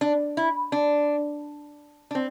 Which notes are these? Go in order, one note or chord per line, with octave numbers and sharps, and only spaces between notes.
D4
E4
D4
D4
C4